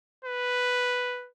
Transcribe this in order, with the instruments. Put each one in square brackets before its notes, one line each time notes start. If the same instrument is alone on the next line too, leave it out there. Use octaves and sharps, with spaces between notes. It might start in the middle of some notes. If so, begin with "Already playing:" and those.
[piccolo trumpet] B4